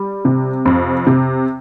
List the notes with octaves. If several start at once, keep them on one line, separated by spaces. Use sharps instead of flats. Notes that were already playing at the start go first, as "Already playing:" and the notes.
Already playing: G3
C3
F2
C3